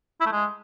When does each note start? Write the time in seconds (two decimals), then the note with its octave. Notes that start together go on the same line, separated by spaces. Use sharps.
0.20 E4
0.26 A3
0.32 G#3